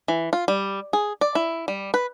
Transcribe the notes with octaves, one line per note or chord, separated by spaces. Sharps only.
E3
F4
G3
G#4
D5
E4
G3
B4